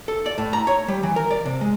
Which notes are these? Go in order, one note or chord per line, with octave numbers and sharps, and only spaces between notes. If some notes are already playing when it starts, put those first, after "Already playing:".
A4
D5
A2
A#5
C#5
G3
E3
A#4
D5
C3
G#3